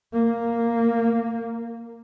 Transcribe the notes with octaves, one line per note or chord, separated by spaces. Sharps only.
A#3